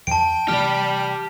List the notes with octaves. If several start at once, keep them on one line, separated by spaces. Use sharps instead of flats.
E2 G5 A5 D7
C3 E3 A3 G4 D5 F6